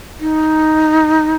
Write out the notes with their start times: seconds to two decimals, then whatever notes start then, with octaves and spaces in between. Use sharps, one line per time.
0.20 D#4